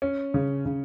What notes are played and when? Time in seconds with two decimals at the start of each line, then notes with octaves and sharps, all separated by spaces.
0.02 C#4
0.34 C#3
0.66 C#3